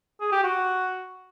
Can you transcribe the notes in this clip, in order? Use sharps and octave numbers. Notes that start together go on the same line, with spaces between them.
G#4
G4
F#4